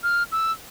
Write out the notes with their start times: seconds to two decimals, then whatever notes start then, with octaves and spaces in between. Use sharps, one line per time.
0.03 F6
0.32 E6